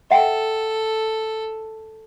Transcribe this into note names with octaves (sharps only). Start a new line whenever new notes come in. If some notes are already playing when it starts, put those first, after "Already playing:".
A4 E5 F#5 G5